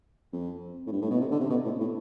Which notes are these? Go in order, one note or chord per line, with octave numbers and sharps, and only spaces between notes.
F2
A2
G2
A2
B2
C3
D3
C3
B2
A2
A2